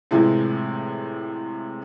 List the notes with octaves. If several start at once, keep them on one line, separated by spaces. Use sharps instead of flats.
A2 C3 E3 F3 G#3